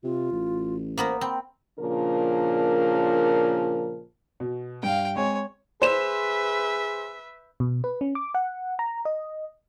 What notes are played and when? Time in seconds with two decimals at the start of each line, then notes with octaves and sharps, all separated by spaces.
0.04 C3 F4
0.32 A1
0.98 A#3 B3 A#4 C5
1.21 C4 B5
1.80 A#2 C#3 F3 D4 A#4
4.40 B2
4.83 G2 F5 G5
5.16 G#3 C4 C#5 G#5
5.82 G#4 B4 C5 E5 E7
7.60 B2
7.84 B4
8.01 C#4
8.15 D6
8.35 F#5
8.79 A#5
9.05 D#5